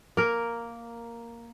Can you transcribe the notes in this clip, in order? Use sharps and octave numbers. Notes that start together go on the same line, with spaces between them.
A#3 A#4